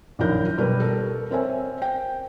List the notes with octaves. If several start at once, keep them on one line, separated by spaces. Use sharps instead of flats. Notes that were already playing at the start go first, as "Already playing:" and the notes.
A#1 F#2 D#3 E4 A#4 G6
B2 D#3 G3 B3 A#4 B4
A4 A#4
C4 A#4 C5 C#5 E5 G#5
G5